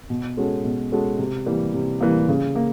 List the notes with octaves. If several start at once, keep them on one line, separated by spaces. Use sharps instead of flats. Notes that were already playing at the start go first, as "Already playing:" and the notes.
B2
G#3 C#4 F#4 A4
B2
G#3 C#4 F#4 A4
C3
E3 G3 A#3
C3
E3 G3 A#3
C#3
A#3